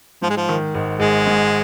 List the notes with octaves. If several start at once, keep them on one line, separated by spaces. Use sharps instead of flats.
G#2 F3
G#3
F3
D#3
G#1
G#1 G#3
G#2